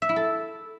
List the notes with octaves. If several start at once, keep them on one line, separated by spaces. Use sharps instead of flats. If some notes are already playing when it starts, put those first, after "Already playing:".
E5
E4
A4